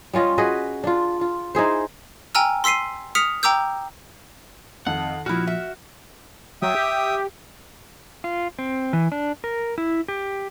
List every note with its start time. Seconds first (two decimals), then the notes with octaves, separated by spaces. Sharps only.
0.13 G3 C#4 F4 D#5
0.38 F#4 G#4 B4 D#5
0.84 D4 F4
1.21 F4
1.55 D#4 E4 G#4 C5
2.35 G5 G#5 A#5 E6 F6
2.64 C6 E6 B6 C7 D#7
3.15 D#6 F6 B6 C#7 F7
3.43 G5 A#5 D6 E6 G6
4.87 F2 D#3 F#5
5.26 A#2 F3 G#3 E4 F#4 F6
5.47 E5
6.62 F#3 E5 G5 D#6
6.75 G4
8.24 F4
8.59 C4
8.93 E3
9.12 D4
9.44 A#4
9.78 E4
10.08 G4